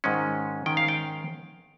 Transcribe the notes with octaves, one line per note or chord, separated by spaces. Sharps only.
G#2 D#3 G#3 C#4
G#2 D#3 G#3 C#4 G5
F5
G5